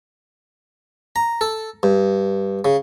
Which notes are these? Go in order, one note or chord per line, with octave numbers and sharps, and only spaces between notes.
A#5
A4
G2
C#3